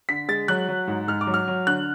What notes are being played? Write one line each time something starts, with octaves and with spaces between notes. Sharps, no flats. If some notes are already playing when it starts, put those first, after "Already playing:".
D3 B6
G#3 A6
F#3 F#6
F#3
G#2
G#2 F6
D6
F#3
F6
F#3
D3 F#6